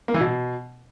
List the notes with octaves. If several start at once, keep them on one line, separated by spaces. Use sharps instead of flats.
A#3
E3
B2